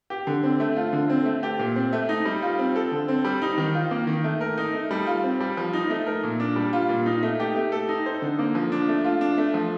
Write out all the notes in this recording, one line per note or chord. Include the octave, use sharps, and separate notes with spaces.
G4
D3
C4
A3
F4
D3
C4
A3
G4
A#2
C4
A3
D#4
G3
F4
C4
A4
D3
C4
G3
D#4
D#3
F4
A#3
D#3
A3
A#4
D#4
A3
G3
F4
C4
G3
F3
D#4
A3
A#4
A#2
D4
G3
F4
A#2
D#4
A3
G4
A3
A4
D#4
C5
D3
A#3
F3
D4
A3
F4
D4
A3
F3